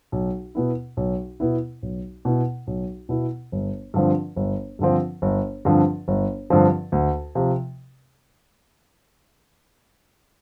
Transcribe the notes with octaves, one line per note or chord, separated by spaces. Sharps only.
B1
B2 B3 E4
B1
B2 B3 E4
B1
B2 B3 E4
B1
B2 B3 E4
G1
G2 D3 F3 C4
G1
G2 D3 F3 C4
G1
G2 D3 F3 C4
G1
G2 D3 F3 C4
D2
C3 F3